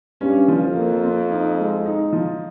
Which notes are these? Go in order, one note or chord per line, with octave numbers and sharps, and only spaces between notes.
G2 C#4
F3
F2
A#3
C4
D#4
G#3
D#4
F3